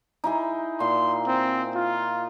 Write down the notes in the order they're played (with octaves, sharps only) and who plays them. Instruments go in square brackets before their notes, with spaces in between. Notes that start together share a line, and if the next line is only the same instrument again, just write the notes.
[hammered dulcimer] D#4 E4 G#4
[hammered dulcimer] A#2 [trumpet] C6
[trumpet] C4
F4